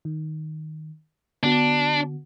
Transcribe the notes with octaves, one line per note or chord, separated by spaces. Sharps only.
D#3
D3 B3 D4 F#4